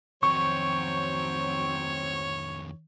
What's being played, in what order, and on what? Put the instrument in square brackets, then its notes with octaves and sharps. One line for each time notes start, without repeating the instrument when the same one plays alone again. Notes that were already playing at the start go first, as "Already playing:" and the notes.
[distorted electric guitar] F2 D#3 [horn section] F#3 C4 [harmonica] C#5 [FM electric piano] C#6